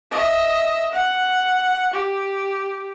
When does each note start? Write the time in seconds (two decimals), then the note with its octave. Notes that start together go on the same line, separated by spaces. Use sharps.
0.11 D#5 E5
0.92 F#5
1.93 G4